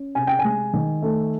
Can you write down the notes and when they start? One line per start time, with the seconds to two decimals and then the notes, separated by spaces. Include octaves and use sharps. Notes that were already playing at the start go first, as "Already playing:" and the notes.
Already playing: C#4
0.15 C3 G#5
0.27 G5
0.39 G#5
0.44 G#3
0.73 D#3
1.02 A3